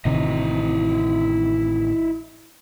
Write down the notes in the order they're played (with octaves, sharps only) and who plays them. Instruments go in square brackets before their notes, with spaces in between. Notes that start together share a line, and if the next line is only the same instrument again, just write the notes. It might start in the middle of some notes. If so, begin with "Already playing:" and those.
[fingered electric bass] A1 C3 D#3 [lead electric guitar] E4 D#5